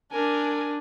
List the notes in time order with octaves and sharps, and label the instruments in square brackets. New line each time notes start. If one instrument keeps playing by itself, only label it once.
[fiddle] D4 [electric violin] A#4 G#5